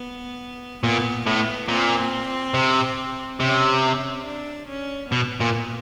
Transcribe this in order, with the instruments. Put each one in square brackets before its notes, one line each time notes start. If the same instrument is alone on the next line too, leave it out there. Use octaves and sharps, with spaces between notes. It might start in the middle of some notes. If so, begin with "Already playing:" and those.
Already playing: [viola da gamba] B3
[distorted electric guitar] A#2 [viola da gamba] B3
[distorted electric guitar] A2 [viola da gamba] B3
[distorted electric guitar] A#2 [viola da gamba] C4
[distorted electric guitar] C3
[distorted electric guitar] C3 [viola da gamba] C#4
[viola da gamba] C#4
D4
C#4
[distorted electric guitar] B2 [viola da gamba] B3
[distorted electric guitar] A#2